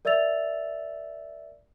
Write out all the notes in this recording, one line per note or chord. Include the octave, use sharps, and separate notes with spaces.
A#4 D5 E5 E6 A6 F7